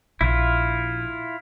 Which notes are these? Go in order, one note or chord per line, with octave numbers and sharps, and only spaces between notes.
A#1 E4 F4